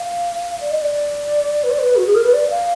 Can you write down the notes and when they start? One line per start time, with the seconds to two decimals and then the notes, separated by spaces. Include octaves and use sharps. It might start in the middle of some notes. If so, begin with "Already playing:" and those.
Already playing: F5
0.61 D5
0.71 D#5
0.82 D5
1.64 B4
1.71 D5
1.79 B4
1.96 F#4
2.06 G#4
2.15 A#4
2.24 B4
2.34 D5
2.50 F5